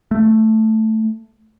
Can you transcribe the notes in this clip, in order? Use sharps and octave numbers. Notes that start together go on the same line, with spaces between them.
A3